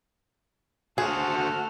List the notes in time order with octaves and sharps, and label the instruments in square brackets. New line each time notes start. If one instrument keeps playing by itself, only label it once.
[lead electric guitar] D2 C5 [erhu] F#4 [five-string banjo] G#4 [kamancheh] A4 F6